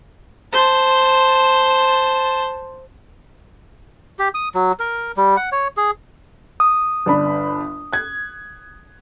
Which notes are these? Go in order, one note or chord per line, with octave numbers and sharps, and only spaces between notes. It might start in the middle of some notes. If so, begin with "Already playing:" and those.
C5 A5
G4
D#6
F#3
A#4
G3
F#5
C#5
G#4
D#6
G1 D4 B5
F#6 G#6